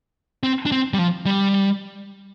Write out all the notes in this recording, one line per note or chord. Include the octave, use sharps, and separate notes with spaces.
C4
D4
C4
G3
F3
G3